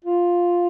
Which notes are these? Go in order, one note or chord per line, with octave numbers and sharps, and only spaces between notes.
F4